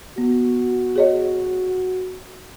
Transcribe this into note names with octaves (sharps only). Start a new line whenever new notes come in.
B3 F#4
G#4 C#5 D#5